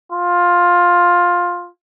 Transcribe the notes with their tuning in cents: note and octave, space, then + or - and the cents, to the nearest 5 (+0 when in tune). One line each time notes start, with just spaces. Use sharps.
F4 +10